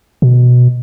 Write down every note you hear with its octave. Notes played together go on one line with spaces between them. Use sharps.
B2